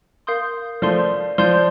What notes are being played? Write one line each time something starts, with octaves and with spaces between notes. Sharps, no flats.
A#4 F5 C6 D#6 G6
F3 A3 D5 F5 C6 G6
F3 D5 F5 C6 G6